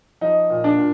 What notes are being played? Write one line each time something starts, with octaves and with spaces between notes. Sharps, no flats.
F3 D#4
A#2
D4
A#2